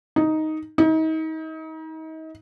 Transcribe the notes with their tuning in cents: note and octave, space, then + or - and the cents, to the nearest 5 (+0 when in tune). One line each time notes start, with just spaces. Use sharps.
D#4 +5
D#4 +35